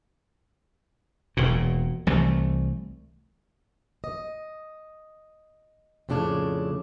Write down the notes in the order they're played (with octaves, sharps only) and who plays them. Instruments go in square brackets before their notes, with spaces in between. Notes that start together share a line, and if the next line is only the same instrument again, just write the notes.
[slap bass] E1 A#2
C2 E3 A3
[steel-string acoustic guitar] D#5
F2 A2 C#3 D4 C#5